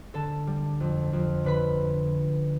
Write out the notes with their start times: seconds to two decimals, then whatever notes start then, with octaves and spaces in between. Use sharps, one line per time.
0.14 D3 A4 A5
0.47 G3
0.80 F2
1.13 F2
1.44 D3 B4 B5